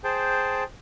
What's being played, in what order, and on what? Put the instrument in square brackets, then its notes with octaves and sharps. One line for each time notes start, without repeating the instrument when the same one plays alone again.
[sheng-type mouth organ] G#4 C5 G5 A5